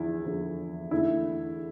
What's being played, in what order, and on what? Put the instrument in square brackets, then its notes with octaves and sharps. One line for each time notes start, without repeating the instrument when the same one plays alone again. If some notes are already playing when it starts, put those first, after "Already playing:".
Already playing: [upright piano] E2 D3 F3 E4
E2 D3 F3
E2 D3 A3 E4